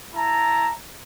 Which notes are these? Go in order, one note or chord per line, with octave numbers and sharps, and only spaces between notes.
E4 A5 A#5